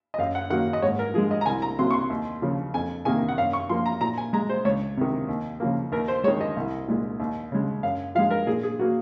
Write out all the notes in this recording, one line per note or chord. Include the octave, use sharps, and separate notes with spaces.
D#5
F#2 F5
F#5
D#3 F#3 A#3 F#5
D#5
G#2 C#5
A#4
F3 G#3 G#4
D#5
A#5
C2 G#5
A#5
C3 F#3 A#3 C6
C#6
C6
D#2
C#3 F3 A#3
F2 G#5
C3 D#3 A#3 G#5
F#5
F#2 F5
C#6
F3 A#3 C6
A#5
A#2 A#5
G#5
G#3 A#5
C5
C#2 C#5
C3 D#3
D#2
C#3 F3 A#3
D#2 A#4
C5
D#3 G#3 C#5
D#5
C2
A#2 G#3
D#2
C#3 G#3
F#2 F5
F3 G#3 F5
A#4
A#2 G#4
G#4
F#3 A#3 F#4